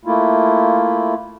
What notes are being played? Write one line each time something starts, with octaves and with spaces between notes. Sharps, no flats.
A3 A#3 E4 F4